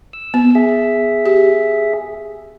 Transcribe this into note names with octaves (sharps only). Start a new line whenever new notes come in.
E6
B3
G#4 E5
G4